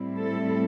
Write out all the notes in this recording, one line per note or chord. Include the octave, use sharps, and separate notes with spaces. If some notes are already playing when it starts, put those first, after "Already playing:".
Already playing: A2 G3 C4 E4
A4